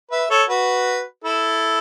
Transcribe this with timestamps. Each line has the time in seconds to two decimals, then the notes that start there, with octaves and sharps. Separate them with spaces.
0.11 B4 E5
0.30 A4 C#5
0.49 F#4 B4
1.24 E4 A4